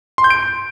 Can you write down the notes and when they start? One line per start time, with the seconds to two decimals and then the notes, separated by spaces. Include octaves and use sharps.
0.18 C6
0.24 G6
0.30 D7